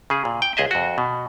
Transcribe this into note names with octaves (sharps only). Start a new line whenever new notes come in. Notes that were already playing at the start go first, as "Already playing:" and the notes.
C#3 G#4
A#2
G5
C#2 G#4 D#5 E5
F2 F#4
B2